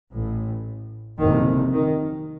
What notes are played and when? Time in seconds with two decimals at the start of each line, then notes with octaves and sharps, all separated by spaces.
0.12 A1 A2
1.19 F#1 F2 C3 D#3
1.73 D#3